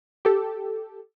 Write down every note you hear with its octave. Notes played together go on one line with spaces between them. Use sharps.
G4 A4